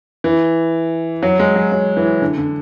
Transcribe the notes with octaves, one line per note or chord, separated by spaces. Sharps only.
E3
F#3
G#3
F#3
F#3
E3
D3
D3